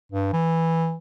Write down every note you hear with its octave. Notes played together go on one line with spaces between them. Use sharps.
G2
E3